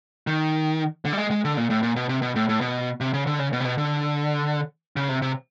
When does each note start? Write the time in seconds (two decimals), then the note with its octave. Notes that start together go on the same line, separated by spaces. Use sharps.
0.27 D#3
1.05 D3
1.13 G3
1.17 G#3
1.31 G#3
1.45 D3
1.57 A#2
1.70 A2
1.83 A#2
1.96 B2
2.09 C3
2.22 B2
2.36 A2
2.49 A2
2.61 B2
3.00 C3
3.14 C#3
3.27 D3
3.39 C#3
3.53 B2
3.60 C3
3.65 B2
3.78 D3
4.96 C#3
5.09 C3
5.22 C3